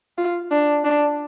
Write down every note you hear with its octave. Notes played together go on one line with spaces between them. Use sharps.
F4
D4
D4